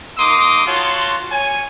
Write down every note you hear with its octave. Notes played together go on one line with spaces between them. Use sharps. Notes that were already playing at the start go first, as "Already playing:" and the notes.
A#3 D#4 C6 D6 D#6
F4 F#4 C#5 A5 C6
C#5 G#5